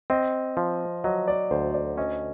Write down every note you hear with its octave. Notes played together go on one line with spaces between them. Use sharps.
C4 D#5
F3
F#3 D#5
D5
D2 C5
D5
C#4 D#5